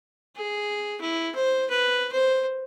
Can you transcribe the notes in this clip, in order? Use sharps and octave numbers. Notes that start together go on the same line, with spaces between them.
G#4
E4
C5
B4
C5